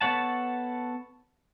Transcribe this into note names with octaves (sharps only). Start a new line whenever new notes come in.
B3 A4 C#5 F#5 A5